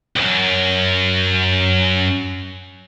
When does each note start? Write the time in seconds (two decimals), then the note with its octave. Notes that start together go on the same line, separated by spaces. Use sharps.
0.16 C2 F#2